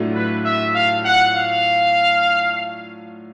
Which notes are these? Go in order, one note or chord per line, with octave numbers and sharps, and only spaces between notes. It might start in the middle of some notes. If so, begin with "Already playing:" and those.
Already playing: A2 F#3 A3 D4 F4
B4
E5
F5
F#5
F5